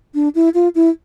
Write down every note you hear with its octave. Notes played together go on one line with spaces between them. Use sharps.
D4
E4
F4
E4